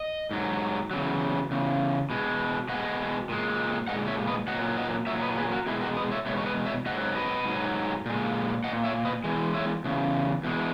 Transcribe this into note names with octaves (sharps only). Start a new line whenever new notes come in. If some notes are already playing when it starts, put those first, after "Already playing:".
Already playing: D#5
G#2 F#3
E2 C#3 F#3
E2 C#3
B2 G#3
B2 G#3 D#5 F#5
A#2 G#3
A#2 G#3 D#5 F#5
C#5 E5
B4 D#5
A#2 F#3 D#5 F#5
D#5 F#5
A#2 F#3 C#5 E5
B4 D#5
G#4 B4
F#4 A#4
B2 G#3 E4 G#4
F#4 A#4
B4 D#5
C#5 E5
B2 G#3 C#5 E5
C#5
B4 D#5
C#5 E5
G#2 F#3 D#5 F#5
B4 D#5
G#2 F#3
A#2 G#3
G#3 D#5 F#5
A#2
C#5 E5
B4 D#5
E2 C#3 E3 G#3
C#5 E5
E2 C#3
E2 B2 G#3